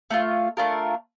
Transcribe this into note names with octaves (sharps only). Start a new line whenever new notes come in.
A3 D4 F4
A3 D4 F4 A#4